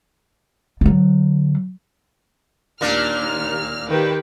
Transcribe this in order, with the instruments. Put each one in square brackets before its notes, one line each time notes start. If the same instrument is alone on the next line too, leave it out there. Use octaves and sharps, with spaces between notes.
[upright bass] D3 F#3
[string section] D#2 F6 [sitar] A#2 A#3 D4
[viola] D#3 G4 [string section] B4